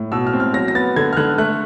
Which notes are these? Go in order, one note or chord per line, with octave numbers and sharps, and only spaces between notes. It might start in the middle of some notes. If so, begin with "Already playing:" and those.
Already playing: A2
B2 E6
F6
C4
F6
F#3 A#6
A#6
B3 A6
D3 G#6
F6
D3 F#6
A3 F#6